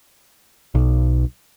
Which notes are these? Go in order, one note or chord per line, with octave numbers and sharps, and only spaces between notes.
B1